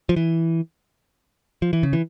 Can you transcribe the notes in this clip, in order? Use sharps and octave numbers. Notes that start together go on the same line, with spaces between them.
F3
E3
F3
E3
C#3
E3